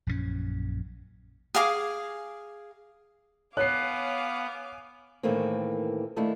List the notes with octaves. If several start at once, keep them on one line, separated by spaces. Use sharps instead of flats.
A#1 F#2 D3 C#4
G#4 F5 G#5 D6
B3 C#5 F5 G#5 D6 F#6 C7
A2 D#3 E3 A3 A#3 C4
D#3 A3 A#3 D4 E4